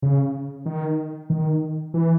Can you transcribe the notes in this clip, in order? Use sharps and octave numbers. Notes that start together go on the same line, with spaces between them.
C#3
D#3
D#3
E3